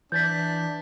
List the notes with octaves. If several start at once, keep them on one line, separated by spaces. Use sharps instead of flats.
E3 D4 G6 A6 B6